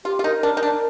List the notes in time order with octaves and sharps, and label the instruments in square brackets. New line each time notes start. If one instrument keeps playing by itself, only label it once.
[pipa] F4 [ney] G4
[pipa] F4
[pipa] D#4 [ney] A#4
[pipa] D4 [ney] A#4
[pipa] D#4
[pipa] D4 [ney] A#4